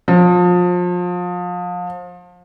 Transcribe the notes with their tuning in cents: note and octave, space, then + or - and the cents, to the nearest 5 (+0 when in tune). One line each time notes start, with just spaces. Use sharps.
F3 +30